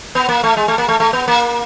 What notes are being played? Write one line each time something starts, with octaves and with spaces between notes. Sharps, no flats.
B3
A#3
A3
G#3
A3
A#3
A3
A3
B3
A#3